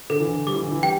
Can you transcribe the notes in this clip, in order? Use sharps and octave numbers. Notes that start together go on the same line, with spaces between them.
D3 A4
E3
D3
G3 D6
E3
D3
E3
G3 G5